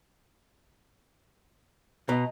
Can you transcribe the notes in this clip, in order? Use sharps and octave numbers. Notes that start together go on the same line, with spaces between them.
B2 D#5 A#5